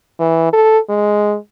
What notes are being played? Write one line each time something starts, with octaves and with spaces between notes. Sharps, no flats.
E3
A4
G#3